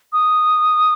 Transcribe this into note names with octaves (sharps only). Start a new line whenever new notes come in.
D#6